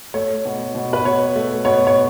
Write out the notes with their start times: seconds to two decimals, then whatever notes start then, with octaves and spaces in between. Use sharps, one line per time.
0.14 A3 C#5
0.45 B2
0.75 B2
0.93 B4
1.05 B2 C#5
1.36 A3
1.65 B2 C#5
1.87 C#5